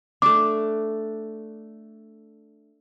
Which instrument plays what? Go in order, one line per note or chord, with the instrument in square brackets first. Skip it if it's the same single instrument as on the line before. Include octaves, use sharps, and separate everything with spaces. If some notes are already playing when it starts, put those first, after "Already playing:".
[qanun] A3 D4 [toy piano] D6